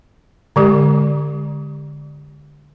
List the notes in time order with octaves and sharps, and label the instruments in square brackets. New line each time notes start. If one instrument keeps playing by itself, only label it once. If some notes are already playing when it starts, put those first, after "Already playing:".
[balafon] D3 G#3 G4